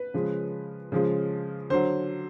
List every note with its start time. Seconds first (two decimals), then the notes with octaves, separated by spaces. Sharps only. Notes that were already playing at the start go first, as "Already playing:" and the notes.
Already playing: B4
0.14 C#3 F3 G#3
0.92 C#3 F3 G#3
1.70 D3 F#3 C5